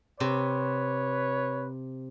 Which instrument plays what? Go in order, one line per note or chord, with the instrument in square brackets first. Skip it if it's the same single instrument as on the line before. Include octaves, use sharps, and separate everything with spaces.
[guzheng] C3 [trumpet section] B4 C#5